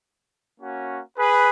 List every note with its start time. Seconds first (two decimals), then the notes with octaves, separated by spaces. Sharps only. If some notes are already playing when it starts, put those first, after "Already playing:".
0.60 A#3 C#4 F#4
1.16 G#4 B4